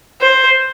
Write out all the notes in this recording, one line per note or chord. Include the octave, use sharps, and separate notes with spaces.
C5